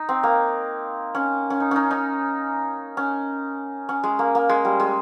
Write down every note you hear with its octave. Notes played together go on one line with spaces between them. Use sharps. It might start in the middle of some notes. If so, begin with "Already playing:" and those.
Already playing: D#4
C4
A#3
C#4
C#4
D#4
C#4 D#4
D#4
C#4
C#4
G#3
A#3
A#3
G#3
G3
G#3